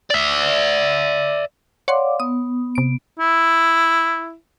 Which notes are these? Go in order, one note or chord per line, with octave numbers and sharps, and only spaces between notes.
D5 E5
C#5 D5 F5 F#5 C6 D6
B3 D#6
C3 D7
E4